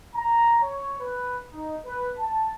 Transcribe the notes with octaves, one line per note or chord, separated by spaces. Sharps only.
A#5
C#5
B4
D#4
B4
A5